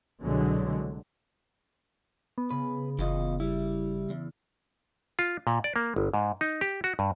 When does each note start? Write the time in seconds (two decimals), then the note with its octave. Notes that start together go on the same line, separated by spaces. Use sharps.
0.21 C2 B2 D3 F#3 G#3
2.38 B3
2.51 C#3 B4
2.99 F#1 E3 F4 D#5
3.40 G3 E4
4.10 E2
5.19 F4
5.47 A#2
5.64 D5
5.76 A#3
5.96 G1
6.14 G#2
6.41 D#4
6.61 G4
6.84 F#4
6.99 G2